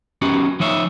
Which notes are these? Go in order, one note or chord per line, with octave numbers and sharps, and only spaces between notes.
B3 C#4 D#4 F#4 G4
F3 D#4 C#5 E5